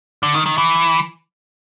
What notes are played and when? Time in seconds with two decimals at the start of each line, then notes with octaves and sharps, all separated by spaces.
0.23 D3
0.34 D#3
0.46 D#3
0.58 E3